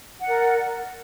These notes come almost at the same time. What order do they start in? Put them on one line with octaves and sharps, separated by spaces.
F#5 D5 A#4